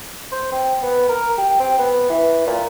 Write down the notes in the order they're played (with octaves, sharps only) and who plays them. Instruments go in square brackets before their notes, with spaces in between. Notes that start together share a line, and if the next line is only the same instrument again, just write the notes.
[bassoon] C5
C4
B3
A#4
G4
C4
B3
E3
A#2